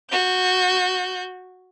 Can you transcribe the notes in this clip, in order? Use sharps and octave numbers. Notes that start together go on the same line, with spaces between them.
F#4 G6